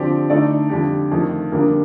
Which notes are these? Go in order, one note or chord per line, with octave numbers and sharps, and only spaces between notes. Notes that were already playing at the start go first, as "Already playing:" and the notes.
Already playing: D3 F3 C4 G4 D5
D3 A3 D#4 A4 D5
F2 D3 G3 D4 G4
F2 D#3 A3
F2 D3 G3 A#3 D4